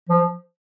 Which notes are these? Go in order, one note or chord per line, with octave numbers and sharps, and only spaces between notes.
F3